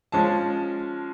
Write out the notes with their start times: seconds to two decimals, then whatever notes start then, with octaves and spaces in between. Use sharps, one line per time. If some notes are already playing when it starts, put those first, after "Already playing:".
0.12 F3 G#3 C#4 A5